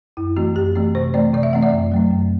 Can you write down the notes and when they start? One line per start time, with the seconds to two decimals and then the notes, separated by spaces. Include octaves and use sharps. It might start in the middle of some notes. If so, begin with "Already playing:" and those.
0.17 F#2 E4
0.37 E3 A3 C4 F#4
0.56 F#2 G4
0.75 E3 A3 C4
0.95 C3 C5
1.14 E3 A3 C4 D5
1.34 C3 D5
1.43 E5
1.53 E3 A3 C4 F#5
1.62 D5
1.73 F#2
1.92 F#3 A3 C4
2.11 F#2